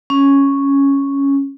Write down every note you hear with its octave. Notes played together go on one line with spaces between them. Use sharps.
C#4